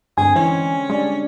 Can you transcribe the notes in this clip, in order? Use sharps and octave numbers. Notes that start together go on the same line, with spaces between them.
G2 D3 G#3 C4 G#4 G#5
E3 C#4
G3 G#3 D4 D5